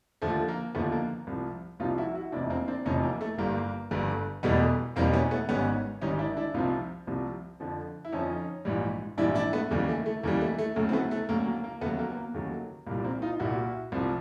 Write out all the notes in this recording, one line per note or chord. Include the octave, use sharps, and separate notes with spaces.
D#2 D3 F3 A3
A#3
D#2 D3 F3 A3 B3
A#3
C2 C3 F3
C2 C3 F3 D#4 F4
E4 F#4
E4 F#4
F1 E2 C3 F3 D4 E4
A#3 C4
C4 D4
F1 E2 C3 F3 C#4 D#4
A#3
A3
G1 G2 D3 G3 A#3
G1 G2 D3 G3
E1 E2 B2 G3 A3 B3
E1 E2 B2 G3 A#3 C4
B3 C#4
A3 B3
G#1 G#2 D#3 G3 B3 C#4
G#1 G#2 D#3 G3 C#4 D#4
D4 E4
D4 E4
C2 C3 F3 D#4 F4
C2 C3 F3
F2 D3 F3
E4
F2 D3 F3 C#4 D#4
A#1 G#2 E3 G3
A#1 G#2 E3 G3 D4 E4
D4 E4
A3 B3
D#2 C#3 E3 G3
A3
A3
D#2 C#3 E3 G3 A#3
A3
A3
D2 C#3 F#3 A3
C4
A3 B3
A3
D2 C#3 F#3 A#3
A#3
A#3
D#2 C#3 F#3 A3 B3
A#3
B3
A#3
D#2 C#3 F#3 A3
C2 A#2 G3 A#3
A#3 C4
D#4 F4
C2 A#2 G3 E4 F#4
C2 C3 F3